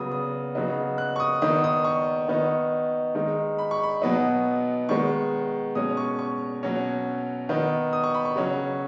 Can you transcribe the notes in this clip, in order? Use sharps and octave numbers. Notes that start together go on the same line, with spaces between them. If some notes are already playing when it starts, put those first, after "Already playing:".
Already playing: C#3 F#3 B3 D#6
D#6
C#3 F#3 B3 D#4
F#6
C#6
D#6
D#3 B3 D#4 D#6
D#6
C#6
D#3 B3 D#4
D#3 G#3 D#4
B5
C#6
B5
B2 F#3 B3 D#4
D#3 G#3 B3 C#6
B2 G#3 C#4 D#6
C#6
C#6
B2 F#3 C#4
D#3 B3 D#4
D#6
C#6
B5
C#6
C#3 F#3 C#4